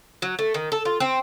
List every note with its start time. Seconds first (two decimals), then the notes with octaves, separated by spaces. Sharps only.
0.22 F#3
0.39 A3
0.54 D#3
0.72 A4
0.85 F4
1.00 C4